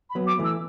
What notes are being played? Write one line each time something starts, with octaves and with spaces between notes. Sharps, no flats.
B5
F#3 B3
D6
E3 A3
E6